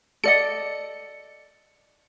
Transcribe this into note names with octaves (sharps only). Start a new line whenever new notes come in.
A4 D5 D#5 C#7